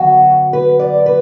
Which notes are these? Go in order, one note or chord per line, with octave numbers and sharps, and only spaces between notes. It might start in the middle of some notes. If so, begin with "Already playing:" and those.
Already playing: F#2 D3 F#3 B3 F#4
B4
D5
B4